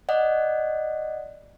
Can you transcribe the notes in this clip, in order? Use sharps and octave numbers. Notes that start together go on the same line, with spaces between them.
D5 D#5 F#5